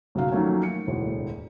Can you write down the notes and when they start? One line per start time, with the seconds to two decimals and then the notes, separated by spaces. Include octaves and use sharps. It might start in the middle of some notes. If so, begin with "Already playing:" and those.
0.15 B1 C#3 F#3 F5
0.31 D#3 F3 F#3 A3 A#3 C#4
0.63 C#7
0.87 E1 D2 A2